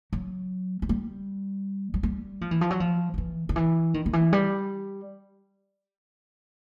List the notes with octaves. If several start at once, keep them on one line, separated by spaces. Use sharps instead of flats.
F#3
F#3
G3
F#3
G3
F3
E3
F3
F#3
F3
F3
E3
D#3
E3
D#3
D#3
E3
G3